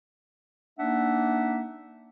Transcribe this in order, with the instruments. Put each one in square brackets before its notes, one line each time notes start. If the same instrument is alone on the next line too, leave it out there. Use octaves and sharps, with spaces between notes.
[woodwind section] A#3 D4 D#4 E5 F#5